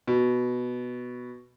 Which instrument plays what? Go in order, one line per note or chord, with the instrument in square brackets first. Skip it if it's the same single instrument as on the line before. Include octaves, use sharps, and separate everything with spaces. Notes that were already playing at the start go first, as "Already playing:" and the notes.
[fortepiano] B2